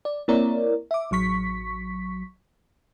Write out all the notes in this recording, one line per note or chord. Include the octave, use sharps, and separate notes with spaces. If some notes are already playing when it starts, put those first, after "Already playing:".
D5
A#3 C4 E4 A#4 C#5 D5
E5 D6
A1 F#3 C#6 B6